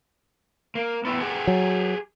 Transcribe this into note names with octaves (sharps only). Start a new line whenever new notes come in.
A#3
B3 E4 G4
G4 G#4 F#5
F#3